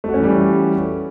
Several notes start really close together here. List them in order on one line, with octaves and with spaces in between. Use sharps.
A3 F#4 C#4 E3 G3